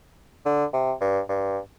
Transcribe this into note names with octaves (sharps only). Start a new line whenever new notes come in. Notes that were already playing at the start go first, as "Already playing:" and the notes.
D3
C3
G2
G2